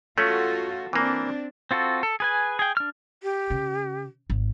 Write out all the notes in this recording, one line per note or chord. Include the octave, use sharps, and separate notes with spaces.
A3 C#4 F4 F#4 A4
E3 A#3 C4 D4
C4 F4 F#4 A4
A4
G#4 B4 G#5
G#4 G5
D4 F6
G4
C#3
G#1